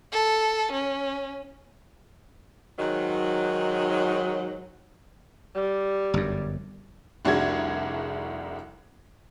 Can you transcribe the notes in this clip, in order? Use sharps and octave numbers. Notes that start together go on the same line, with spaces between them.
A4
C#4
G#2 D#3 F#3
G3
G1 F#2
F1 C2 D4 F#4 G#4 G#6